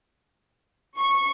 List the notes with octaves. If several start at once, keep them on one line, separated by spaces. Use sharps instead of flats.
C#6